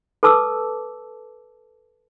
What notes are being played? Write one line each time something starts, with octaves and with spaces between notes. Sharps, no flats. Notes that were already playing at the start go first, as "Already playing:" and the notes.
A4 B4 A5 D6 E6